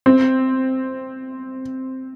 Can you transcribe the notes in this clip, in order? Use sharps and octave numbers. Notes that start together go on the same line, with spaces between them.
C4